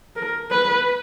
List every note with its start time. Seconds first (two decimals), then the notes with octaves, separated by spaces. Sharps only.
0.16 A#4
0.51 B4